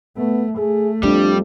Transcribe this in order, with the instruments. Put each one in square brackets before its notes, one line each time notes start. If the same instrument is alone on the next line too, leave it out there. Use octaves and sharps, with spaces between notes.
[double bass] A3 [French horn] B3
[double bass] A3 [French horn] G#4
[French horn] F2 [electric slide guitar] G3 [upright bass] D4